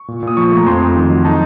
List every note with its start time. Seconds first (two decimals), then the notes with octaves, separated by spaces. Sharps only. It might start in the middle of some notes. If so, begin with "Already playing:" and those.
Already playing: C#6
0.08 A#2
0.23 A#2 D#6
0.37 F3 C#6
0.52 A3
0.57 A#5
0.66 F2 C6
0.81 F2
0.96 D#3
1.10 F#3
1.25 D#4 A5